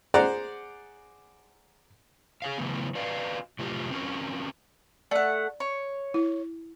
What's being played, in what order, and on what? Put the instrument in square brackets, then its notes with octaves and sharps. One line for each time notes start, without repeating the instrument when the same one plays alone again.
[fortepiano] G#4 C5 D5 F#5 A#5
[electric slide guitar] G#4 C#5 F5
C#3 E3 F#3 A3 B3
F#4 B4 D5 D#5 F5
A2 C3 F#3 A3 F4 G4
C4 C#4 F#4 A#4
[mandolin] A3 F#5 [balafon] D5
[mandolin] C#5
[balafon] E4